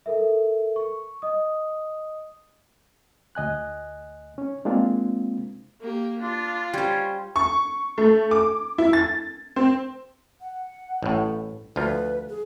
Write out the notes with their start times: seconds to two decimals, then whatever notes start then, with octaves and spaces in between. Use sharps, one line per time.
0.06 A4 A#4 E5
0.76 C#6
1.22 D#5 D#6
3.35 D2 D#5 G#5 F#6
4.38 C#4
4.65 G#3 A#3 C4 D4 F4
5.81 A#3 G4
6.21 D4 F4
6.74 G3 C#4 C5
7.36 C#6
7.98 A3
8.31 D6
8.78 E4
8.93 A6
9.56 C4
10.41 F#5
11.03 A1 A2
11.76 D2 F3 F4 B4
12.29 G#4